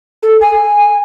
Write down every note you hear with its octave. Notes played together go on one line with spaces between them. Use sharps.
A4
G#5